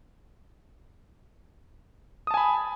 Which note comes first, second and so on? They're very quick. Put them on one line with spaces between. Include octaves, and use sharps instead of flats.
D#6 A5 G#5 B5